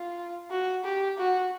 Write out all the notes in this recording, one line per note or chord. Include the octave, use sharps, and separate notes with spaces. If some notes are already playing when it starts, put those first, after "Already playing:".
Already playing: F4
F#4
G4
F#4